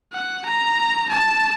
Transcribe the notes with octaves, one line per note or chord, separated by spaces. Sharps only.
F#5
A#5
A5